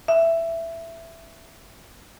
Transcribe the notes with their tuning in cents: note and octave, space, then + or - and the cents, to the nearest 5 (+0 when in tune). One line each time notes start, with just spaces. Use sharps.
E5 +10